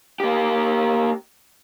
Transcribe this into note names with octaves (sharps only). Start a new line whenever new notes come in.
A#3 G4